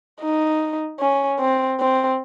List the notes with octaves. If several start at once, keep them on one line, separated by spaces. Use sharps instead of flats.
D#4
C#4
C4
C4